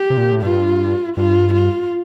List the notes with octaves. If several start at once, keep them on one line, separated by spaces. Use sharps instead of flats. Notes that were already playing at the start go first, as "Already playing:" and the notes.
Already playing: G4
C3
A#2
A2
G2 F4
G2 F4
F4